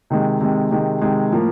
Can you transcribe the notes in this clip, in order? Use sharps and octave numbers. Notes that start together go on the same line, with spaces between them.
C3 D#3 G#3
C3 D#3 G#3
C3 D#3 G#3
C3 D#3 G#3
A2 F3 A#3